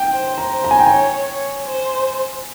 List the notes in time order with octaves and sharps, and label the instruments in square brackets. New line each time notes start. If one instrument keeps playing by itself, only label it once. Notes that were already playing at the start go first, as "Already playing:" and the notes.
Already playing: [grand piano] G5
[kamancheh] C5
[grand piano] A#5
[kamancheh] C5
[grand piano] A#5
G#5
G5
[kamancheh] C#5 [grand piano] G#5
[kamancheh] C#5
C5